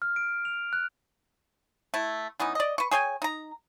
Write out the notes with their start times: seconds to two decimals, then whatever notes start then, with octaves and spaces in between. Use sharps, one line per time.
0.02 F6
0.16 D7
0.45 F7
0.73 F#6
1.94 A3 E4
2.40 E3 B3 C#4 D#4
2.55 D5 D#5
2.78 B4 C#6
2.91 G#4 C#5 G5 G#5
3.22 D#4 A#5